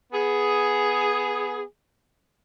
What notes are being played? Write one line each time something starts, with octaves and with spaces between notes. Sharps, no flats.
B3 G#4